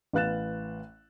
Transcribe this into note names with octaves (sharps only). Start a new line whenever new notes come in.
A1 B4 F5 F#6 A6 E7